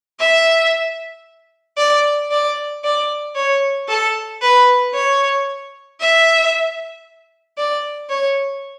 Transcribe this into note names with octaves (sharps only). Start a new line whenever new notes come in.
E5
D5
D5
D5
C#5
A4
B4
C#5
E5
D5
C#5